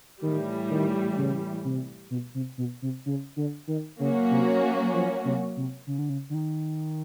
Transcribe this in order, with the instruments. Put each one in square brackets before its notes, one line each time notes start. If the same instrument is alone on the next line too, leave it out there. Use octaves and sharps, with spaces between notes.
[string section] A2 E3 G3 [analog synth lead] D#3
[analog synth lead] D#3
C#3
C3
B2
C3
B2
C3
C#3
D3
D#3
[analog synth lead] C#3 [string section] F#3 A#3 C#4 F#4
[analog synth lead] C3
F3
C3
C3
C#3
D3
C#3
D3
D#3